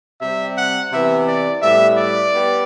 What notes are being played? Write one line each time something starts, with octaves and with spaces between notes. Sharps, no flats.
C3 G3 C4 E5
F#5
C3 E3 B3 E5
D5
A2 G3 B3 E5
D5
G3 B3